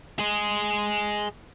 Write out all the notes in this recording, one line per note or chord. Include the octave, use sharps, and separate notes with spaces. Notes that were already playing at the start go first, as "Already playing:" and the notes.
G#4 D#5